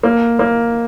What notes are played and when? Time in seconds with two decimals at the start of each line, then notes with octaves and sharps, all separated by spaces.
0.03 A#3
0.39 A#3